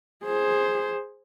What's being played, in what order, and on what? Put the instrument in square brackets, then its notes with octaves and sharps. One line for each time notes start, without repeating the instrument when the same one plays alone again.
[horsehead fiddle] G#4 C5